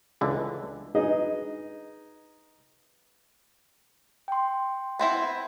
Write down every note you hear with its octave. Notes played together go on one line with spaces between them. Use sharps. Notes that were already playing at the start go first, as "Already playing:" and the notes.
C#2 D3 E3
D#4 G#4 B4 D#5
G5 C6
B3 C4 E4